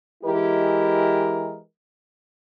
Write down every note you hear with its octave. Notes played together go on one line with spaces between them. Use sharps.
E3 G#3 E4 G4 A#4 D#5